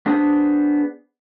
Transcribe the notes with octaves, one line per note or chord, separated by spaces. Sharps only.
B3 D4 G#4 C5 D#6